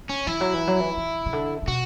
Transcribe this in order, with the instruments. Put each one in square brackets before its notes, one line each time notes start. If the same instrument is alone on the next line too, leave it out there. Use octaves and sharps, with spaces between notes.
[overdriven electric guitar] C#4
[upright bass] E3 [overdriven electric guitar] E4
[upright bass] F#3
E3
F#3
E3
E3
C#3
D3
A2
[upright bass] B2 [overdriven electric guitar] F#4